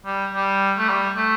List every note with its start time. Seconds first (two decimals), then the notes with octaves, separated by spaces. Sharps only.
0.06 G3
0.34 G3
0.78 A3
0.89 G3
1.17 A3